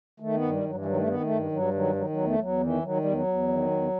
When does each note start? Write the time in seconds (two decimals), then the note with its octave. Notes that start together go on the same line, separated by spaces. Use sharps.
0.20 D#3 A3
0.35 B3
0.42 G2
0.49 G3
0.64 G2 F#3
0.75 E3
0.85 D#3 F#3
0.97 A3
1.07 D#3 B3
1.22 A3
1.29 G2
1.51 G2 F#3
1.73 D#3 F#3
1.95 D#3 F#3
2.10 F#3
2.17 E2
2.24 A3
2.33 E3
2.39 E2 F#3
2.60 D#3 E3
2.83 D#3 F#3
2.97 G3
3.04 E2
3.12 F#3
3.27 E2
3.48 D#3
3.71 E2